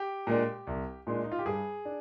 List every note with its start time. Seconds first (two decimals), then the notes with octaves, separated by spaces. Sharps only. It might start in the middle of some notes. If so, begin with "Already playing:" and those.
Already playing: G4
0.27 A#2 G#3 D4
0.67 C2
1.07 A#2 G#3 D4
1.24 D#4
1.32 F4
1.39 G4
1.46 G2 G#4
1.85 D4